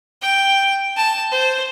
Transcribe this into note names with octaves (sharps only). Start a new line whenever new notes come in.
G5
A5
C5